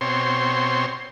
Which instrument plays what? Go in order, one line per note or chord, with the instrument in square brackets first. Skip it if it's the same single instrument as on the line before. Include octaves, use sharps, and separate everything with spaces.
[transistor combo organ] B2 C4 C#5 C6